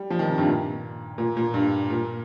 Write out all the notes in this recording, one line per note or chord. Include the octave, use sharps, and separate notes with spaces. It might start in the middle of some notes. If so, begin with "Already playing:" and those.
Already playing: G3
F3
D#3
C3
G2
A#2
A#2
A#2
G2
A#2